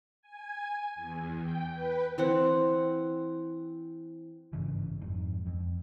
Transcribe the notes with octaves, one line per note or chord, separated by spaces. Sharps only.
G#5
E2
G5
B4
E3 C4 F#5
G#1 G2 C#3 E3
F2 G#2
F2